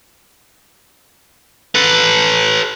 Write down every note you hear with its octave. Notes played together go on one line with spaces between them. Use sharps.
A4 B4